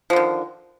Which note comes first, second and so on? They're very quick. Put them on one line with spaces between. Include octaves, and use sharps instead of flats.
F3 D3 D#3